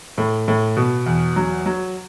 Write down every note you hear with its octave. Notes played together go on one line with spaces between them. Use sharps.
A2
A2
B2
E2
F#3
F#3